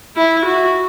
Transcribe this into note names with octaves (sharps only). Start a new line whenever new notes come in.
E4
F#4